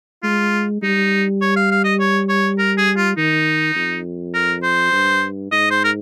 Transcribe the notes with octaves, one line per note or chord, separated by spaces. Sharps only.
G#3 F4
G3 D#4
C#5
F5
F5
D#5
C#5
C#5
A#4
G#4
F4
D#3 D#4
F2
A#4
C5
G2
G#2 D#5
C5
A#4